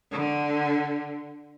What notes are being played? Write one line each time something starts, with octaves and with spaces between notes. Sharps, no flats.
D3